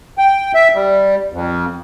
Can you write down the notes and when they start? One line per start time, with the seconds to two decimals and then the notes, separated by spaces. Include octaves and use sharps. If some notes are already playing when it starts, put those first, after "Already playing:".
0.18 G5
0.54 E5
0.75 G3
1.32 F2